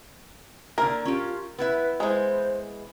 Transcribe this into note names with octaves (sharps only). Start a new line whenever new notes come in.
D3 A#3 A#4
C#4 F4 G4
B3 E4 B4 E5
E3 G#3 C5